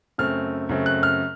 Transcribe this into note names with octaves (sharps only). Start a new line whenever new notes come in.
F#2 C#3 A3 C4 F6
F#2 C#3 A3 C4
F#6
F6